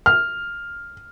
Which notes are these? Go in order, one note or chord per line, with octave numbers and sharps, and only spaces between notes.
F6